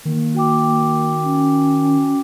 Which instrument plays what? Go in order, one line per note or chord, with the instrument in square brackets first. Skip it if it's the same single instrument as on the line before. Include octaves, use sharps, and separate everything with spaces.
[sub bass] D#3 [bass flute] A#3
[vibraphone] F#4 G5 D6
[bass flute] C#4